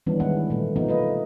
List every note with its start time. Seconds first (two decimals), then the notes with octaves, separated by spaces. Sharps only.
0.06 D#3 E3 G3 B3 C#4 D4
0.20 D#3 G#3 B3 E4 F#5
0.50 A#2 A3
0.76 B2 F3 A#3 B3 D#4
0.88 A3 B4 D#5